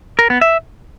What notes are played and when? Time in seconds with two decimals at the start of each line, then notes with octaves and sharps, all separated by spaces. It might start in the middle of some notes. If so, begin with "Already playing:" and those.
0.19 A#4
0.30 B3
0.41 E5